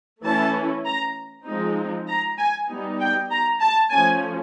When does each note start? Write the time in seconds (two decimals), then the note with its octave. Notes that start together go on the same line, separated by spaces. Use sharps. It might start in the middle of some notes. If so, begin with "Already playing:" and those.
0.24 E3 A3 C#4 E4 A5
0.85 A#5
1.46 F3 G#3 C4 D#4
2.08 A#5
2.38 G#5
2.69 G3 B3 D#4
3.00 G5
3.31 A#5
3.62 A5
3.92 F3 A3 C#4 G#5